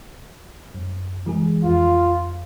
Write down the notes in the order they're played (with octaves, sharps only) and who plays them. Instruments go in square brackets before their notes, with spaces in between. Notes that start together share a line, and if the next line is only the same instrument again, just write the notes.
[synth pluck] F#2
E3 G#3 G#4
[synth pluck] F2 [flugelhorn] F4